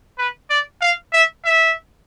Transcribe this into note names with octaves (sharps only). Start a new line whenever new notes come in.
B4
D5
F5
E5
E5